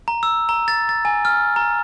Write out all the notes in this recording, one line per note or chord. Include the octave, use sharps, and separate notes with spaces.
A#5
E6
A#5
A6
A6
G#5
F6
A#5